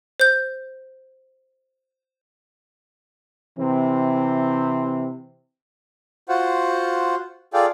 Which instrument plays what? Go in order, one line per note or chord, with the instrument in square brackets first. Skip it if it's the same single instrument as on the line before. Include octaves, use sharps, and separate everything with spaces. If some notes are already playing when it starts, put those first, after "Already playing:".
[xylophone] C5 G6
[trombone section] C3 E3 C4
[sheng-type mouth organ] F4 F#4 C5 F#5
F4 G#4 A4 D5 F5 G5